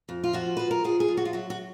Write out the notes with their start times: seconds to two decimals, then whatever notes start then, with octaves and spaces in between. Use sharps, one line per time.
0.09 F2
0.24 F4
0.33 F3 F#4
0.57 F3 B4
0.71 A#4
0.84 F3 G#4
1.00 G#4
1.08 F3
1.17 F#4
1.25 F4
1.33 F#3 F#4
1.50 F#4